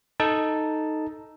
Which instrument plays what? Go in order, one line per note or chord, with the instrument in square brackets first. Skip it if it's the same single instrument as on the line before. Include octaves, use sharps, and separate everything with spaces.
[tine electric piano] D#4 A4 A5